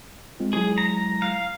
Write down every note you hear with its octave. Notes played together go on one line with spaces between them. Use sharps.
G#3 C4 F4
F#3 G#3 E4 G#4
A#5
F5